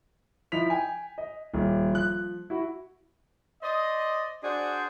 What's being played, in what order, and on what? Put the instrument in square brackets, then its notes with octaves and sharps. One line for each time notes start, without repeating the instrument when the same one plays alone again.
[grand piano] F3 D#4 E4 B6 F7
G5 G#5
D#5
D#1
F3 F#6
E4 F#4
[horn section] C5 D5 D#5
D4 F#4 G#4 C5 D5